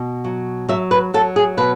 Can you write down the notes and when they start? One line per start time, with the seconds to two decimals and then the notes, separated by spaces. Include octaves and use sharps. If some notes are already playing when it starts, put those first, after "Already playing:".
Already playing: B2
0.24 F#3
0.69 F#3 E5
0.91 B4
1.14 F#3 A4
1.36 G#4
1.57 B2 B4